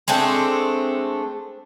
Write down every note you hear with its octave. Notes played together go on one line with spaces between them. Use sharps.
G#3 A3 C4 D4